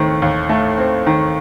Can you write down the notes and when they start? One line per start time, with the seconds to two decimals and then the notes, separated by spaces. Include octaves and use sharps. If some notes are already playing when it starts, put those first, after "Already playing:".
Already playing: D#2 D#3 A3 C4
0.22 D#2
0.49 A3
0.78 C4
1.06 D#3